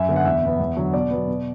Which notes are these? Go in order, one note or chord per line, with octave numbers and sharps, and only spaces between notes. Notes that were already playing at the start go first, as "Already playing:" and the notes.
Already playing: F#2 E5
D3 B3
F#5
E2 E5
B2 B3
E2
D3 F#3
B2 D5
F#3 B3
B2